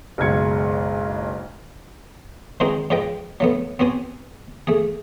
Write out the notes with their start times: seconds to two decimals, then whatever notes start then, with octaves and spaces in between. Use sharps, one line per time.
0.18 F#1 B1 G#3 G#6 C#7
2.60 D#3 E3 G#3 C4 D#4 F#4
2.90 G#2 F3 B4 D#5 G5
3.40 F#3 A3 B3
3.79 B3 C4 F#4 G#5
4.67 A3 G#4